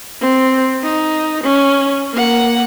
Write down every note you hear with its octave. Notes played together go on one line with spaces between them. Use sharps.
C4
D#4
C#4
A#3 F#5